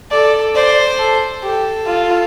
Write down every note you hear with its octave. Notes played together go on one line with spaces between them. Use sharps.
A4 D5
C5 D5
A4
G4 A4
F4